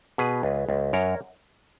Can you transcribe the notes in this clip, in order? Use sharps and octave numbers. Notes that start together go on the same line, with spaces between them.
B2 G#4 B4
C#2
C#2
F#2 A#4 C#5